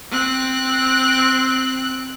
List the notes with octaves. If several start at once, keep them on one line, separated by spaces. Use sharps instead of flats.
C4 F#6